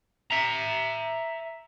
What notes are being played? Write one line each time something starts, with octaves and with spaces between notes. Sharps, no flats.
E5 A#5